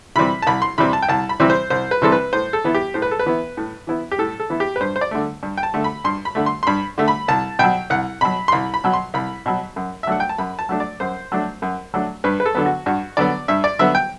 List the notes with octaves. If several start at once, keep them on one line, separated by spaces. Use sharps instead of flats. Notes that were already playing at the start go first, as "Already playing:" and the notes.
C3 E3 G3 C4 B5
A5
C2 B5
C6
C3 E3 G3 C4 B5
A5
G5
C2 A5
B5
C3 E3 G3 C4
C5
C2 C5
B4
C3 E3 G3 C4 A4
B4
A2 C5
A4
E3 B3 E4
G4
A2 C5
B4
A4
B4
E3 B3 E4
A2
E3 B3 E4
G4
A2 A4
A4
E3 B3 E4
G4
B4
G2 C5
C5
D5
D3 A3
G2
G5
A5
D3 A3
B5
G2 C6
B5
D3 A3
C6
C6
G2 B5
D3 A3
B5
C2 A5
B2 F#3 G5
C2 F#5
B2 F#3 B5
C6
C2 B5
B5
B2 F#3
C6
C2 B5
B2 F#3
F#2
E5
F#3 A3 D4 F#5
G5
A5
F#2 B5
A5
F#3 A3 D4
D5
F#2 C5
F#3 A3 D4
F#2
F#3 A3 D4
G2 B4
B4
A4
D3 F#3 B3
F#4
G2 F#4
D3 F#3 B3 D5
G2 E5
D5
D3 F#3 B3 E5
G5